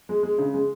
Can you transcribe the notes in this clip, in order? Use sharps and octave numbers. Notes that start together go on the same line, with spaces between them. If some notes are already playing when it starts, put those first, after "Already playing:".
G#3
G#3
C#3
G#3